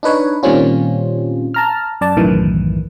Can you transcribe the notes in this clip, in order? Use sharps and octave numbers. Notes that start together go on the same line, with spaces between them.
D4 D#4 B4 C#5
A#2 D#3 G3 C4 C#4 F4
A5 A#5 F6
F#2 D5 A5
B1 F#2 A2 D#3 E3